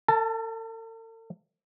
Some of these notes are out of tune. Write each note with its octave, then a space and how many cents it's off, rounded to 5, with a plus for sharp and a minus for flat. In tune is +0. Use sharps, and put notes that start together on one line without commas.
A4 +45 A5 +0